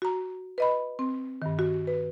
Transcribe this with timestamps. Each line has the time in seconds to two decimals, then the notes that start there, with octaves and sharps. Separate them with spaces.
0.02 F#4 A#5
0.58 B4 D#5 B5
0.99 C4
1.42 G2 D#3
1.59 F#4
1.87 B4